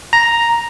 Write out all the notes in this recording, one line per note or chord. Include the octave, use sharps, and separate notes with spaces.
A#5